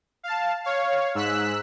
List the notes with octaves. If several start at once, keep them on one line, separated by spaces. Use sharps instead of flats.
F5 A5
C#5 F5
G#2 E6 F#6 B6